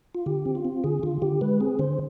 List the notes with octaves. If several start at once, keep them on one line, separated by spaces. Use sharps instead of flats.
F4
D3 G4
C4
F4
C4
D3 G#4
D3 F4
D3 G4
G#3 B4
C4 G#4
D3 C5